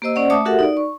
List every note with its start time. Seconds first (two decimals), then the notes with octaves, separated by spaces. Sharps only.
0.02 A#3 G4 C5 D#5 E6
0.16 C#4 C5 D5 F#5
0.30 A3 E5 A5 D6 D#6
0.45 F#4 G4 A4 A#4 E5 F#5
0.59 D#4 D5
0.77 C#6